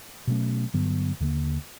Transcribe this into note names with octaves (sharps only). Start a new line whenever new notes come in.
B2 F#3 A3 C#4
G2 D3 F#3 B3
D#2 D3 F3 A#3